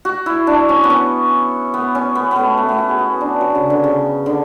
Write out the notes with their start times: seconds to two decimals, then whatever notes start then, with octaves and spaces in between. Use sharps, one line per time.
0.05 F#4
0.26 E4
0.47 D4
0.69 C#4
0.84 B3
0.90 C#4
1.74 B3
1.95 C#4
2.15 B3
2.31 A3 B3
2.58 A3
2.69 B3
2.78 F#4
2.89 G#4
2.99 F#4
3.21 D4
3.41 F#3
3.55 C#3
3.70 D3
3.84 C#3
4.26 D3